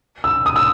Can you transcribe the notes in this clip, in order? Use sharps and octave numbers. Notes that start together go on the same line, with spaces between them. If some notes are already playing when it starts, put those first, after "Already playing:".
E6
D#6
E6